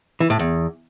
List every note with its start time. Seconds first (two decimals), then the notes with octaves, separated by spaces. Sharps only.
0.20 E3
0.30 A2
0.39 E2